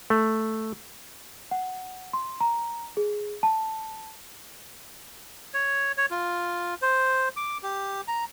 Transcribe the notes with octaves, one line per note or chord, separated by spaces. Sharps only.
A3
F#5
C6
A#5
G#4
A5
C#5
C#5
F4
C5
D6
G4
A#5